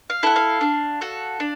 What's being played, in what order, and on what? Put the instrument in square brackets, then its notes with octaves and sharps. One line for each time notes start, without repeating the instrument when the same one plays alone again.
[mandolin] F5
E4 A4 F#5
F5
D4
F#4 A4
D4